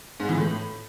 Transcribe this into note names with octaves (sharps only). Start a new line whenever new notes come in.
G#2
E3
A2